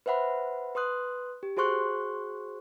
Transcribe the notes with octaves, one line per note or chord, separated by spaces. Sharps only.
B4 C5 E5 F#5 B5
B4 C6 D#6 F#6
G4
F#4 G#4 C5 C6 C#6 F#6